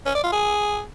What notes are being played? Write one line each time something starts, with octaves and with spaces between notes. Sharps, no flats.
C#4
D5
F4
G#4